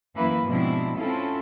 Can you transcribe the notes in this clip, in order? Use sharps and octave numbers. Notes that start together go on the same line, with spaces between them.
F#2 E3 A#3 E4 B4
G#2 B2 F3 C4 D4 E4
C4 C#4 E4 F4 A4